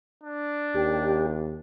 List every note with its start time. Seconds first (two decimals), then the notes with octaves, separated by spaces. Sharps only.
0.23 D4
0.75 D#2 G4